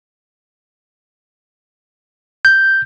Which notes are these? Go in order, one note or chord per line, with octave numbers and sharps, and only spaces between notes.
G6